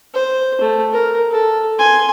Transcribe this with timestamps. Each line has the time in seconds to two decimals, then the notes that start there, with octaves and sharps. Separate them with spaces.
0.14 C5
0.61 A3
0.93 A#4
1.31 A4
1.79 G#5 C6